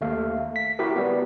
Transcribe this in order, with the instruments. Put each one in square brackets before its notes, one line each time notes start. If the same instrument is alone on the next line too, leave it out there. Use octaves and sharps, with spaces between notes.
[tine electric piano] D#2 A3 F5
B6
E4 F#4 G4 A#4
G3 B3